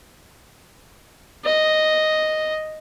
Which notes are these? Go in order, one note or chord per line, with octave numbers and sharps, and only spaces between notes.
D#5